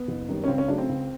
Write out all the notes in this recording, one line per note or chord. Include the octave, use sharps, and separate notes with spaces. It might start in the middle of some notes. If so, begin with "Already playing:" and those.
Already playing: B3
F#1
F#2 D#3 G3
C#4
C#2 C4
C#4
C#3 F#3 A3 D4
C4
C#2